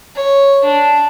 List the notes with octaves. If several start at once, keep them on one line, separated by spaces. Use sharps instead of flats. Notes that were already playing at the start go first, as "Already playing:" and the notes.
C#5
D4